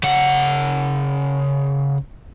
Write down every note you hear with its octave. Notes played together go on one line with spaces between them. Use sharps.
C#3 F#5